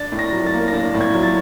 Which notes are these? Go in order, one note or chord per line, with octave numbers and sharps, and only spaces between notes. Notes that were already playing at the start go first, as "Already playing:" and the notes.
Already playing: D4 A6
A2
A#6
F#3
A6
A#3
A#6
D4 A6
A2
G#6
F#3
A6